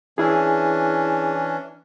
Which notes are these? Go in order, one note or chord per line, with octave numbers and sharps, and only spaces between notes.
E3 C#4 D4 E4 G#4